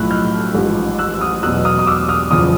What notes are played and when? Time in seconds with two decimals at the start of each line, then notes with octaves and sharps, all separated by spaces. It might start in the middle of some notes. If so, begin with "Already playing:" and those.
Already playing: B1 A2 F3 E6 F#6
0.11 F6 G6
0.55 A1 G#2 F3
0.99 E6 F#6
1.21 D#6 F6
1.43 E2 B2 F#3 E6 F#6
1.65 D#6 F6
1.79 D#6
1.87 D6 E6
2.09 D#6 F6
2.31 F#1 E2 C#3 F3 D#6 F6